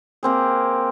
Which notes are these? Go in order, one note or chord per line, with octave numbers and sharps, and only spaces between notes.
A#3 C4 G#4